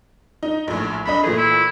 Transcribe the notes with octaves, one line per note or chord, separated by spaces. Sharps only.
D#4
A#1 A2
C2 D4 D#5 B5
A#2 E3 A3 G#4
E4